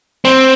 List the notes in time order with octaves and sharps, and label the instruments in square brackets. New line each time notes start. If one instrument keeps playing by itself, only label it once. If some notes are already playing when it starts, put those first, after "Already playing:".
[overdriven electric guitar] C4